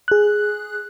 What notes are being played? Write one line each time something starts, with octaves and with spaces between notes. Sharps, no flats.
G#4 F#6